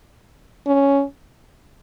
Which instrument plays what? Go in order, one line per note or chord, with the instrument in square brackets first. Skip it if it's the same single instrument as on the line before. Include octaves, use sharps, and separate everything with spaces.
[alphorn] C#4